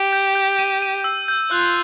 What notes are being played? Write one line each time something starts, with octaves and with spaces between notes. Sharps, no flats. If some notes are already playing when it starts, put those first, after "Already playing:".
Already playing: G4
G6
G6
D#7
D#7
E6
G6
F4 F#6